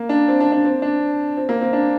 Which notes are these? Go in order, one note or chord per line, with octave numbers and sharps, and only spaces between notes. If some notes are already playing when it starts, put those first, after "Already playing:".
Already playing: A#3
D4
C4
D4
D4
C4
D4
C4
A#3
C4
D4